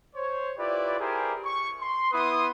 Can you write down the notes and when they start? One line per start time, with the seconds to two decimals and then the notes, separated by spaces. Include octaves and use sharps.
0.15 C5 C#5
0.58 E4 F4 G4 B4 D5
1.00 E4 G4 G#4 A#4 C5 G#5
1.45 C#6
1.81 C6
2.12 B3 E4 B4 C6 D#6